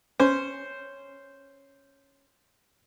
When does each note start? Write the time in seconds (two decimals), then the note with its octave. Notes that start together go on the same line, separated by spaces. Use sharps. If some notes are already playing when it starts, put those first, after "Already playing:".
0.20 C#4 C5